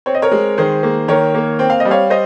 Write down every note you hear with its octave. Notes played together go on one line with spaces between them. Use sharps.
C4 C#5
D#5
A#4 C#5
G#3
D#3 G#4 C5
A#3
D#3 A#4 C#5
A#3
C4 G5
F5
D#5
G3
C#5 F5
C5 D#5